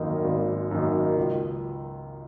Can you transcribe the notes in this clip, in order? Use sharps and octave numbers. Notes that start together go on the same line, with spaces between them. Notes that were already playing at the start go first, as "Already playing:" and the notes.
Already playing: G#1 F#2 D#3 A#3 D#4
G#1
F#2 D#3 A#3 D#4
C#2